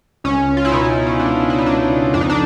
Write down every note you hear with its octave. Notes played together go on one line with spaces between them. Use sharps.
C#2 C#4
F4
E4
B2 C#4 D#4
C#4
C#2 D4
E4
D#4
C#2 D4
F2 D4
D#4
D4